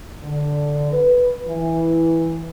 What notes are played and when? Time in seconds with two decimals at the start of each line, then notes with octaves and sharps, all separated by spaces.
0.23 D3
0.92 B4
1.46 E3